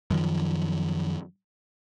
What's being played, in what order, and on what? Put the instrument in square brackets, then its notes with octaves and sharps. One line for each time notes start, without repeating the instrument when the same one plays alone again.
[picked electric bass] F#2 D#3 F3